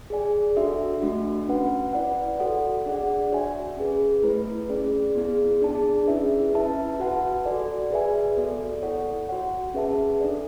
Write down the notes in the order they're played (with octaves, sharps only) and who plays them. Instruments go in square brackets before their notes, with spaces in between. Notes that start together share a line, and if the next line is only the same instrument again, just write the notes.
[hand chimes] G#4 D5 G#5
D4 F#4 A4 E5
A3 D4 F#4
C#4 F#4 B4 F#5
E4 B4 D5 F#5
F#4 A4 C#5 F#5
D4 G#4 D5 F#5
F#4 C#5 E5 G#5
C#4 G#4 B4
A3 E4 B4
C#4 G#4 D5
B3 E4 G#4
D4 G#4 D5 A5
C#4 E4 G#4 B4 E5
C#4 E4 B4 E5 A5
F#4 B4 F#5 A5
F#4 A4 D5 G#5
G#4 B4 E5 G#5
B3 F#4 A4 D5
E4 A4 C#5 F#5
F#4 C#5 F#5
C#4 G#4 B4 E5 A5
D4 A4 D5